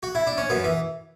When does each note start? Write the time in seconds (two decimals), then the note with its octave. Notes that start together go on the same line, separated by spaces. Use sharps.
0.03 F#4
0.15 E4
0.27 D4
0.38 C#4
0.50 F#2 B3
0.64 E3